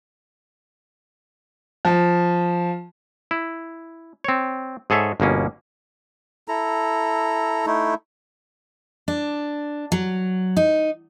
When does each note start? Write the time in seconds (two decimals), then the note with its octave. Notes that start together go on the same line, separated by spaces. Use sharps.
1.85 F3
3.31 E4
4.24 C4 C#5
4.90 G#2 G#4 A4 C#5 E5
5.20 G1 B2 A#3 C#4
6.48 E4 A4 A#5
7.66 A3 D#4 E4
9.08 D4
9.92 F#3
10.57 D#4